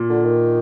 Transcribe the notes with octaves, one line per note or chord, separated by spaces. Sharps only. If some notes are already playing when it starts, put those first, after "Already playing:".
Already playing: A#2
D3
D#3